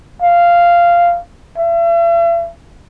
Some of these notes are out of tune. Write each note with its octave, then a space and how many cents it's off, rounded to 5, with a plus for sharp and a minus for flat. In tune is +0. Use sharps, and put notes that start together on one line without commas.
F5 -10
E5 +45